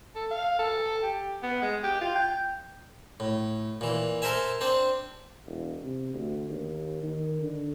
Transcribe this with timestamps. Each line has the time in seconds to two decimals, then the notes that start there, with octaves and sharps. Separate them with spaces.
0.15 A4
0.31 F5
0.59 A4
1.03 G4
1.42 B3
1.62 G#3
1.83 G4
2.01 F4
2.15 G5
3.20 A2
3.81 A#2 E3
4.22 A4 A#4 C5 E5 G#5
4.61 C4 D4 C5
5.45 E1
5.83 C3
6.14 D2
6.49 D#2
7.03 D#3
7.41 D3